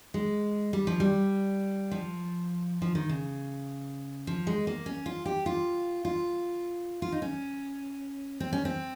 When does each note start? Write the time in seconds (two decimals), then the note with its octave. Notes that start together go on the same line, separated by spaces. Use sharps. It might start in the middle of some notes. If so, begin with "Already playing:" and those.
0.14 G#3
0.73 G3
0.87 F3
1.00 G3
1.91 F3
2.82 F3
2.95 D#3
3.09 C#3
4.27 F3
4.47 G#3
4.67 A#3
4.86 C#4
5.06 F4
5.26 G4
5.46 F4
6.05 F4
7.02 F4
7.12 D#4
7.22 C#4
8.40 C4
8.53 C#4
8.65 C4